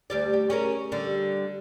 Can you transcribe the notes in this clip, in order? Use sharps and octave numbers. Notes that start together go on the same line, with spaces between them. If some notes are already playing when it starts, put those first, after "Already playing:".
D2 G3 D5
G4
C#4 G#4 A#4
D3 G3